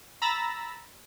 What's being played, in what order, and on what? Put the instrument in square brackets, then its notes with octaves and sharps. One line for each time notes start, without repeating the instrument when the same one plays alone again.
[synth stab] A#5 B5 E6 A6 A#6